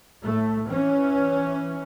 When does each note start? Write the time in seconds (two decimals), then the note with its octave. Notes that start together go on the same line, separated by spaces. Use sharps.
0.24 A2 A3
0.69 E3 C#4